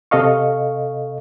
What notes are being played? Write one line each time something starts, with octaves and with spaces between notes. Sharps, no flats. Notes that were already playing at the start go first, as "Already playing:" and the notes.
C3 A4 D#5 F5 C#6